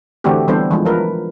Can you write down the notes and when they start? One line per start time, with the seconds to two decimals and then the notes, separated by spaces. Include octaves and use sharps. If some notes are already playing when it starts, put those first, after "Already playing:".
0.24 D3 E3 A3 C4 F#4 G4
0.48 E3 G3 B3 D4 A4 C5
0.71 E3 F3 G#3
0.85 F3 A#4 B4